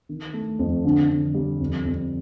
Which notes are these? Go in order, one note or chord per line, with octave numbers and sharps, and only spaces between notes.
D#3
A3
F2
D3
D3
G3
F2
F2